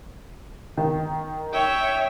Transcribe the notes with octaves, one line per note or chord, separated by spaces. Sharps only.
D#3
C#5 E5 G5